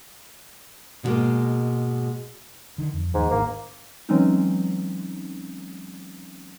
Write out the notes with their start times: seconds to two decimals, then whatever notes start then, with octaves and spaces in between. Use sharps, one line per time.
1.03 G#2 B2 D#3 G3 G#3 A#3
2.78 D3 D#3
2.93 F2
3.14 D#2 G#2 F3
3.31 G#1 A#3 D4
4.09 E3 F#3 G#3 C4 C#4 D#4